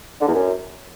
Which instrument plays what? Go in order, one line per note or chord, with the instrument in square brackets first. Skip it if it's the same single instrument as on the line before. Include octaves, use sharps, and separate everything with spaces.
[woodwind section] D3
E2
F#2